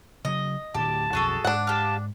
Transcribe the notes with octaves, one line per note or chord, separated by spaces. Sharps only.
C#3 E3 F#3 D#5
D1 D2 G4 A5
B1 F2 F#4 G#4 A4
G#2 D4 F#5
G4 F5 A5